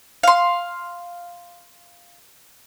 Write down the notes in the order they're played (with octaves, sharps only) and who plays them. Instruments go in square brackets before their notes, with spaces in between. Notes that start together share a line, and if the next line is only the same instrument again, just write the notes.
[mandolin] F5 C6